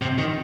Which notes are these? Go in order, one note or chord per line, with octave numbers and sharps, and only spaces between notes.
C3
D#3